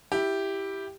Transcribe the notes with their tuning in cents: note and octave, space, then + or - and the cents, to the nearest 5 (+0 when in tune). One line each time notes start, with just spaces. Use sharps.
E4 +0 G4 +0